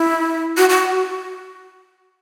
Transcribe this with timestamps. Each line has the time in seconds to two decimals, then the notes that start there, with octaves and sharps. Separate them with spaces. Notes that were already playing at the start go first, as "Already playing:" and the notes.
Already playing: E4
0.57 F#4
0.69 F#4